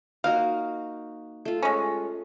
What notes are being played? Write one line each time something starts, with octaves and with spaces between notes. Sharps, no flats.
A#3 D#4 F#4 F5
A3 F4
G#3 C#4